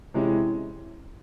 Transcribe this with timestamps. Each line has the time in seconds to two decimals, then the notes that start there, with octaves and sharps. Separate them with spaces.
0.14 C3 E3 G#3 C#4 E4